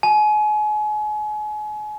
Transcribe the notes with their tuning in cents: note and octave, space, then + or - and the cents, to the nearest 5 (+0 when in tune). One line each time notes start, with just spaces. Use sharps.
G#5 +35